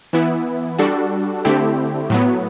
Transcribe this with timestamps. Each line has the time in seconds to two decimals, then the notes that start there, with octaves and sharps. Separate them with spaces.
0.13 E3 B3 E4
0.79 G3 D4 F#4 A4
1.45 D3 A3 C4 E4 G4
2.10 A2 F#3 B3